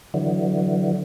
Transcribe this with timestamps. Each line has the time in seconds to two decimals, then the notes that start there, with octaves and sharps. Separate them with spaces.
0.14 D3 E3 F#3